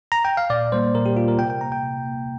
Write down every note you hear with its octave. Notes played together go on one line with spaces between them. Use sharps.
A#5
G5
F5
A#2 D5
G3 A#3 C5
A#2 A#4
G4
G3 A#3 F4
A#4
C3 G5
G5
A#3 A#5
G5
C3
A#3